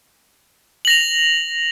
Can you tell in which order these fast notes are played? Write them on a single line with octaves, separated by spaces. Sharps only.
F#7 A#6 F7